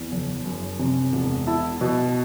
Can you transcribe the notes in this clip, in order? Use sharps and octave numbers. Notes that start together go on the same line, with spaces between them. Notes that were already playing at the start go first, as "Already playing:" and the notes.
Already playing: E2
F#1
F#2
C3
E1
E4 A5
B2